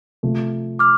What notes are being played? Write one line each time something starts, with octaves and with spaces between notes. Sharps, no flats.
C3 F3 A3
D6 F6